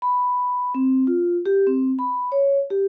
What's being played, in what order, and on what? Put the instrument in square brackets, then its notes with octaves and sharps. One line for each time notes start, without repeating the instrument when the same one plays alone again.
[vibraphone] B5
C4
F4
G4
C4
B5
C#5
G4